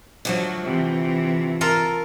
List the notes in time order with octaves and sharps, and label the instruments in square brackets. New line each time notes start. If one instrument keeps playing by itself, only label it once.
[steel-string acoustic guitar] D3 F3 A3 [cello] F#3
[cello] C3 E3
[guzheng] F4 A4 A#4